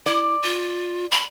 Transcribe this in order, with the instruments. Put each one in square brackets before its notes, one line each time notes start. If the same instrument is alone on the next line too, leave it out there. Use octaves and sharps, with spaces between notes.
[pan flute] E4 [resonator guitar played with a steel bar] D5
[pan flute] F4
B5